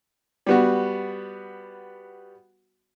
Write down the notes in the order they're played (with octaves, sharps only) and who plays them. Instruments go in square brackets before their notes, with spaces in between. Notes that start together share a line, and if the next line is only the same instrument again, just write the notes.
[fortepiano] G3 B3 F#4